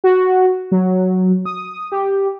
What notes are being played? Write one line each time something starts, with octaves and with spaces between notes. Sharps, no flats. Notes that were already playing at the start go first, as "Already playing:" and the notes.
F#4
F#3
D#6
G4